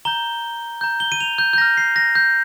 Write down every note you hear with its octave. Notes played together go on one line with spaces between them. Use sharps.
A#5 G6 G7
A#5 G6
G7
D#7
F7
G6
G6
A#5 F6 A#6
C7
A#6
G6